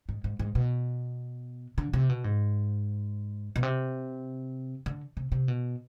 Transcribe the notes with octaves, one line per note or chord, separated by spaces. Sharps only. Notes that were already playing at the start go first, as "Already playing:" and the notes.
G#2
G#2
G#2
B2
D3
C3
B2
G#2
B2
C3
D3
C3
C3
B2